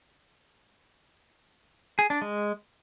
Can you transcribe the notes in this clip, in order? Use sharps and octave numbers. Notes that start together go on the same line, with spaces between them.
G#4
D4
G#3